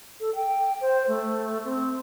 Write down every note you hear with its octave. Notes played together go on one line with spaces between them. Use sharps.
A4
G5
C5
A3
C4